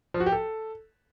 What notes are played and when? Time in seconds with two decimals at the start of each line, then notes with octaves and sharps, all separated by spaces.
0.14 F3
0.20 F#4
0.26 G4
0.32 A4